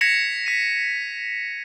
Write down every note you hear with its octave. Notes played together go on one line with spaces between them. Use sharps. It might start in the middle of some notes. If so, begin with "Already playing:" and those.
G#6 A#6 B6 C#7 E7 F7
B6 D#7